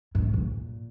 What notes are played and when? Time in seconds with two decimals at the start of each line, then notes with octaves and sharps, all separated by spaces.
0.15 G#2
0.34 A#2